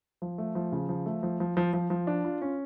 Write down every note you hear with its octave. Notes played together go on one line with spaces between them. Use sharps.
F3
A3
F3
C#3
F3
A3
F3
F3
F3
F3
F3
D4
F4
C#4